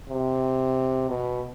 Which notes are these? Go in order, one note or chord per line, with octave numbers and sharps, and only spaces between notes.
C3
B2